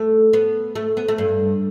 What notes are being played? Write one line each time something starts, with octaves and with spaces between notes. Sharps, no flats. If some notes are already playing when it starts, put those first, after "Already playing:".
Already playing: A3
B3
A3
B3
A3
G2